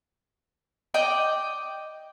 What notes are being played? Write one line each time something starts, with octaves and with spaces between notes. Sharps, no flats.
D5 D#5 G5